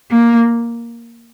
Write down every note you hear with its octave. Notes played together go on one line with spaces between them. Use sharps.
A#3